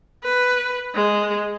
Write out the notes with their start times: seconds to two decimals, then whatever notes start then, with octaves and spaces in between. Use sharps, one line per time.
0.24 B4
0.95 G#3